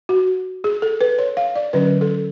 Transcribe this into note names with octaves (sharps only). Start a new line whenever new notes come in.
F#4
G#4
A4
B4
C#5
F5
D5
D3 F#3 C#4 B4
A4